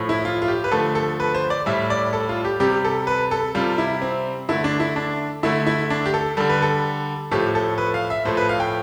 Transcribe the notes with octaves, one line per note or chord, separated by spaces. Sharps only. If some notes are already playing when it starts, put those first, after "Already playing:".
Already playing: A2 F3 A3
E4
F4
F4
G4
B4
D3 F3 A3 A4
A4
B4
C5
D5
A2 G3 E5
D5
A4
F4
G4
C3 G3 G4
A4
B4
A4
C3 G3 F4
E4
C4
D3 A3 E4
D4
E4
D4
D3 A3 E4
E4
D4
G4
A4
D3 G3 A4
B4
A4
A2 F3 A3 G4
A4
B4
F5
E5
A2 F3 A3 C5
B4
F5
G5